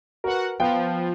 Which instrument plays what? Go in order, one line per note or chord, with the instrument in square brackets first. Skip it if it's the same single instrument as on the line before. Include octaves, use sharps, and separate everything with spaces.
[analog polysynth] F#4 F#5 [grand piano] A#4 B4
[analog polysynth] F3 [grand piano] B3 F4 G5